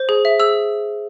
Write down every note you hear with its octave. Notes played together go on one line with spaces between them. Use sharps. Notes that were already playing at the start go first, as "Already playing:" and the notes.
Already playing: C5
G#4
E5
G#4 E6